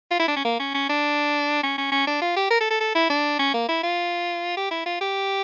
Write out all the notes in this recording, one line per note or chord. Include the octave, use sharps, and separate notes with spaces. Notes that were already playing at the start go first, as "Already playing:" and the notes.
F4
E4
D4
C#4
A#3
C#4
C#4
D4
C#4
C#4
C#4
D4
F4
G4
A#4
A4
A4
A4
E4
D4
C#4
A#3
E4
F4
G4
E4
F4
G4